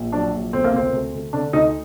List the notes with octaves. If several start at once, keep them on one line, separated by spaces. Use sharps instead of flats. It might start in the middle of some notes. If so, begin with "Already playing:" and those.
Already playing: A#1
F#3 D4
A#1
D2 C4
A#3
D2 C4
D2
D2
D3 D4
D2 D#4